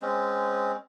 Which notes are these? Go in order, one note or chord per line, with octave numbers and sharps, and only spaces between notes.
G#3 C4 C#4